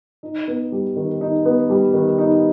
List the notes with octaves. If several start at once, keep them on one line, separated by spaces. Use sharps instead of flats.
D#4
B3
G3
D#3
D#4
B3
G3
D#3
D#4